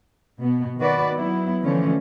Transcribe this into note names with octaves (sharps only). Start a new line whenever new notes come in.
B2 B3
D#3 F#4 B4 D5
F#3 B3 E4
D3 E3 F3 A3 C#4